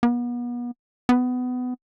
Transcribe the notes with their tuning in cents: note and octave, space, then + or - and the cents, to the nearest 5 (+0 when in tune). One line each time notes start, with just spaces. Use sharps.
B3 -35
B3 +20